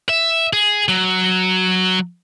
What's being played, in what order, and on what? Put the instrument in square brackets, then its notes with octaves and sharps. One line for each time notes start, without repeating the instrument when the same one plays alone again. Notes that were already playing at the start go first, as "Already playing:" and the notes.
[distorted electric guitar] E5
G#4
F#3